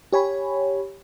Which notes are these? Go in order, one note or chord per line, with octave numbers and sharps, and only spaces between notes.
G4 C#5 G#5 B5